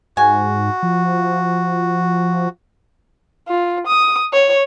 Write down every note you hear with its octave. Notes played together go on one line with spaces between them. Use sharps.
G#2 F#4 G#5
F3
F4
D#6
C#5